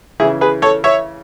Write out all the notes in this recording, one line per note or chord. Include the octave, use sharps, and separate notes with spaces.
C#3 E3 E4 G#4
G#4 B4
A4 C#5
C#5 E5